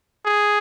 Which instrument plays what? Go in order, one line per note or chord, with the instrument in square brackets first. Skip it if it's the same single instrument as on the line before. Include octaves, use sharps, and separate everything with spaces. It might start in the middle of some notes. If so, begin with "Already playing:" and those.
[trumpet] G#4